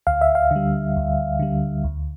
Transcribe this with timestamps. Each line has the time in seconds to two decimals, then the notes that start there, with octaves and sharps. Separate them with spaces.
0.07 D2 F5
0.21 E5
0.35 F5
0.51 D3 G3
0.96 D2
1.39 D3 G3
1.84 D2